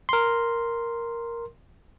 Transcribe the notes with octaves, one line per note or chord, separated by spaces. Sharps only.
A#4 C6